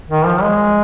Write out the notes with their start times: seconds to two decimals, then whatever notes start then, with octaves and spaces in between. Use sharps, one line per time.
0.10 D#3
0.26 F3
0.42 G#3